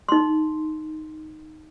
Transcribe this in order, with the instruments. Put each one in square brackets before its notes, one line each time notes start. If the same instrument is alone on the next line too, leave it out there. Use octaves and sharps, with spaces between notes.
[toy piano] D#4 C6